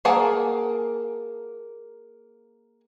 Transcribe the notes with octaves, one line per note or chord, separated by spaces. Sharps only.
A#3 G#4 A#4 F#5 A5